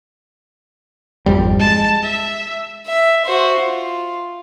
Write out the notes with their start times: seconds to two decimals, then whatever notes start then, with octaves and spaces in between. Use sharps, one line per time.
1.26 G#1 F2 G3
1.59 G#3 A5
2.03 E5
2.86 E5
3.25 F#4 C5
3.60 F4